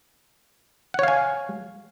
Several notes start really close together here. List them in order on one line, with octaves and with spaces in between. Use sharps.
F#5 C#5 F5 G#5